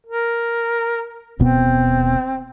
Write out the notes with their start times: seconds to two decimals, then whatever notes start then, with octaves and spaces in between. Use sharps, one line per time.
0.06 A#4
1.39 D#1 B2 B3 C4